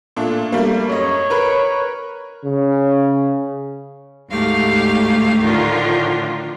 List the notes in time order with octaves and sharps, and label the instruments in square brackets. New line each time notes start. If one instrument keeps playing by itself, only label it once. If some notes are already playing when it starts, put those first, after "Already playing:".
[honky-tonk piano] A#2 A3 D4
G3 A3 A#3
[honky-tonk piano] F#2 D#5 [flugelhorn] C#5
[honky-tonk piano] A#4 B4 B5
[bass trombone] C#3
[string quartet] D2 G#2 A3 G4 F5
A2 D3 D#3 F3 F4